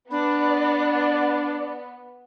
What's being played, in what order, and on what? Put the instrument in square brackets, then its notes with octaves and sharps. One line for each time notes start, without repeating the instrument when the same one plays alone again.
[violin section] B3 [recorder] D4 [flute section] D5 [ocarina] B5